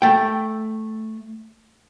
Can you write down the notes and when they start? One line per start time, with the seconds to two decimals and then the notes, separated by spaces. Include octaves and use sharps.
0.02 A3 G5